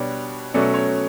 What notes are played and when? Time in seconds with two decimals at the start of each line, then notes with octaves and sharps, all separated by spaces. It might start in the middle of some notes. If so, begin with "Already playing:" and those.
Already playing: B2 G3 D4 C#5
0.54 B2 F#3 A3 C#4 D5
0.74 C#5